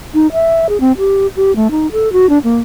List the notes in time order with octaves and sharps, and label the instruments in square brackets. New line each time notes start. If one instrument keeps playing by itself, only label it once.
[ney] D#4
E5
G#4
C4
G4
G4
A3
D#4
A4
F#4
D4
A#3